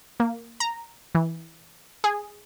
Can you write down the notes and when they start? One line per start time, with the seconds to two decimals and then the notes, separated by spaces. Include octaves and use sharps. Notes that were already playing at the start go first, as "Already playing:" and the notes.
0.20 A#3
0.60 A#5
1.15 E3
2.04 G#4